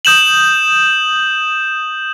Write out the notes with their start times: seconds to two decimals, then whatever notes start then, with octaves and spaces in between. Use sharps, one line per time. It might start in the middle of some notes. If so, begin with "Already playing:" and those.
0.05 D#6 G6 E7 F#7